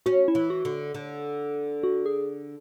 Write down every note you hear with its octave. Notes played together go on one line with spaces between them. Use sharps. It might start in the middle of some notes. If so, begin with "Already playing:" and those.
C#4 F#4
E4
E3
F#4
D3
D3
F#4
G#4